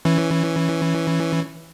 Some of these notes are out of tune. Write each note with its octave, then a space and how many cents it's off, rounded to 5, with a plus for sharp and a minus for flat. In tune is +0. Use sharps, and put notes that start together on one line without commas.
E3 +0 C#4 +0